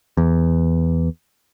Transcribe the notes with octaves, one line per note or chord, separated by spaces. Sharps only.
E2